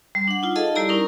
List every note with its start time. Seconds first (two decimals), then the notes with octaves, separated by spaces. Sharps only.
0.15 G3
0.28 D4 F#5
0.43 D#4 F4
0.56 G#4 A4 D#5 F5 A5
0.76 G3 E4 G4 D5 A#5
0.89 C#4 D#4 A#4